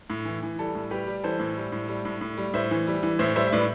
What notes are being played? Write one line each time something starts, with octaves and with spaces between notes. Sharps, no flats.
A2
E3
E3
G3 A4
A2
G3 G4 B4
G3
E3 A4 C5
A2
G3
A2
G3
A2
A2
G3
A2 C5 E5
E3
G3
E3
A2 C5 E5
G3 C5 E5
E5
A2 B4 D5